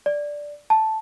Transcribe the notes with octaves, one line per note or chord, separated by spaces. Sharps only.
D5
A5